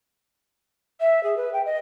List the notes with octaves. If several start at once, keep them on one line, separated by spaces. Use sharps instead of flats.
E5
G#4
B4
G5
D#5